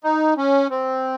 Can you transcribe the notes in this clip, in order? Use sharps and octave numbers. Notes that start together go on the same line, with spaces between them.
D#4
C#4
C4